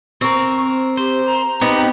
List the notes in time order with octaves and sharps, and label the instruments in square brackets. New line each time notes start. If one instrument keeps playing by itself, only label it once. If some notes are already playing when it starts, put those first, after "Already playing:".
[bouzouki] C4 A#4 [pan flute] C#6
[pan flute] G4 [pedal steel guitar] C5
[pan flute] A#5
[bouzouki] B3 [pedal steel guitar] C4 D#4 G4